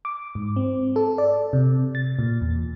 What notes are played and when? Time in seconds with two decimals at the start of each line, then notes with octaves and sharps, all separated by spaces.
0.05 D6
0.35 G#2
0.56 C4
0.96 A4
1.18 D5
1.53 C3
1.95 A6
2.19 A#2
2.41 E2